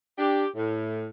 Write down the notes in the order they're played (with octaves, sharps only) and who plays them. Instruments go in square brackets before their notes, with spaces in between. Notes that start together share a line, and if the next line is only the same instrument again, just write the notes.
[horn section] D4 G4
A2